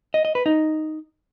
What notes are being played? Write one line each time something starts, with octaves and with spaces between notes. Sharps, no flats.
D#5
D#5
B4
D#4